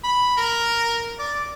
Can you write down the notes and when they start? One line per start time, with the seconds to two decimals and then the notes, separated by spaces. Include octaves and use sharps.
0.04 B5
0.37 A#4
1.19 D5